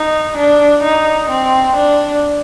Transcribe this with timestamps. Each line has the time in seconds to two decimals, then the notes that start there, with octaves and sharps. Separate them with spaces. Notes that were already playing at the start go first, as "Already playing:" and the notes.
Already playing: D#4
0.37 D4
0.84 D#4
1.30 C4
1.77 D4